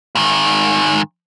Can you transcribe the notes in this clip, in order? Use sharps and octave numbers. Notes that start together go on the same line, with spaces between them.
G#2 D#3